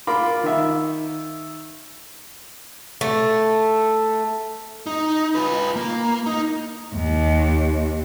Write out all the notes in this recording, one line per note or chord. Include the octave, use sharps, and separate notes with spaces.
F4 A#4 B5 D6
D#3 E5
A3
D#4
F4 B4
A#3
D#4
D#2